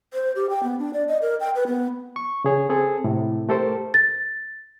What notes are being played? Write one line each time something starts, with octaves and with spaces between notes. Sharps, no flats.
C5
G4
G5
B3
D4
D5
D#5
A#4
G5
B4
B3
C#6
C#3 G#4 C#5
C4 G#4 A4
A2 C3
A3 G4 A4 A#4 C5
A6